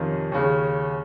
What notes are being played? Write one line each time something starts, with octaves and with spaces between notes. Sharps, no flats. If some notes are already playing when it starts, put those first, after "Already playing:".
Already playing: F2 C3 D#3 C#4 F4
D#2 C#3